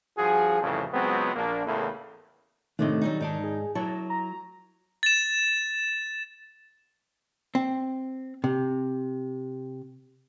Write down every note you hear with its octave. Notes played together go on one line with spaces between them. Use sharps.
G2 F3 F#4 G#4
C2 F2 A2 C#3 E3 A4
C#2 F#3 G#3 B3 C4
A#1 A#3 D4
E2 A2 C#3 E3 A#3 A4
A2 C3 D#3 A3 D4 D#5
F#3 G3 D#4
G#2 D#4 D5 A5
G#4
F#3 E4 F#4 A#4 A5
A#5
A6 E7
C4
C3